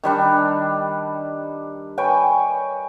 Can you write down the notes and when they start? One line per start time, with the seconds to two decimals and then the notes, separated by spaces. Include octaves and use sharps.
0.03 D#3 G3 D4
1.98 B4 C#5 G5 G#5